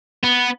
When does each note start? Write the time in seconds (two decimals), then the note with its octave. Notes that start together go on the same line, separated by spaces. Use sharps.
0.24 B3